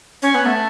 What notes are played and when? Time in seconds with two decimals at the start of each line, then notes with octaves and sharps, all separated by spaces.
0.22 C#4
0.35 B3
0.46 A3